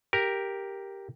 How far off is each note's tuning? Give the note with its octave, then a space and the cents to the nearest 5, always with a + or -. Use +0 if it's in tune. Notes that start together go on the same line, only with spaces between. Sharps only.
G4 +0 A#4 +0